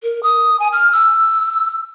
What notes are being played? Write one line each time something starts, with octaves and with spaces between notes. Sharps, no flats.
A#4
D#6
G#5
F6
E6